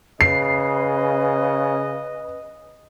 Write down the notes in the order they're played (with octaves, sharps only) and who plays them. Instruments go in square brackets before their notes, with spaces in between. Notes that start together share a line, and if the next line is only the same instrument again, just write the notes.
[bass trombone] C#3 [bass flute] B4 [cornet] D#5 [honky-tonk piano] C7